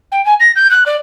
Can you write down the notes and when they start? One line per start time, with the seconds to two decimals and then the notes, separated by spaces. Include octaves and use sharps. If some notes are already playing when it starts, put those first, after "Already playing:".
0.12 G5
0.25 G#5
0.40 A#6
0.56 G6
0.71 F#6
0.86 D5